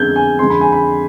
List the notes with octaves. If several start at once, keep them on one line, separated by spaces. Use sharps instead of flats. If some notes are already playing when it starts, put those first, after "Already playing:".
Already playing: F2 D3 G#3 B3 G6 G#6
G#5
F2 D3 G#3 C4 C6
B5
G#5
B5